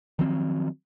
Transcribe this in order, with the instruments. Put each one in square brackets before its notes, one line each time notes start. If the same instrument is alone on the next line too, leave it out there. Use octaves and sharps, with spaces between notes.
[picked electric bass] D#3 F3 F#3 C4